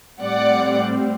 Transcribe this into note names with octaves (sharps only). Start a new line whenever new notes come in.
A2 G3 C4 D5 F#5